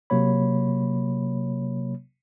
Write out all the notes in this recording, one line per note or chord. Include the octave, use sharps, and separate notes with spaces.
C3 F#3 A#3 C#5 B5